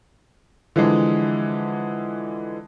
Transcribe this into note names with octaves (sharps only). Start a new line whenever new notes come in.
D3 E3 F3 G#3